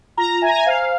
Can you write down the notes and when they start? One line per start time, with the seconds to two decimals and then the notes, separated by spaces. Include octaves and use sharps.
0.17 F4 A#5
0.42 E5 G#5
0.49 A#5
0.56 G#5
0.66 C5 F5